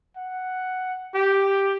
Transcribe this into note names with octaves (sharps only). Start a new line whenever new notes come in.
F#5
G4